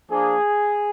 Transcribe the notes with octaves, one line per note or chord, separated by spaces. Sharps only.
F3 A#3 D4 G#4